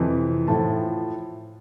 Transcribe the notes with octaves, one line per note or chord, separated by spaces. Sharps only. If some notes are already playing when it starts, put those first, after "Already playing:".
Already playing: F2 C3 E3
A2 F3 A5